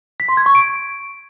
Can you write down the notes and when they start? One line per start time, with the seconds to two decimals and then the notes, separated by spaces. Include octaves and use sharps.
0.20 B6
0.28 C6
0.37 G#6
0.46 C#6
0.55 D7